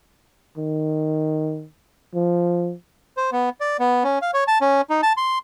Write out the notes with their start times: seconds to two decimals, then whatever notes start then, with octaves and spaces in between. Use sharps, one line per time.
0.57 D#3
2.15 F3
3.17 C5
3.32 B3
3.60 D5
3.79 B3
4.04 C#4
4.22 F5
4.34 C#5
4.48 A5
4.61 C#4
4.90 D#4
5.03 A5
5.17 C6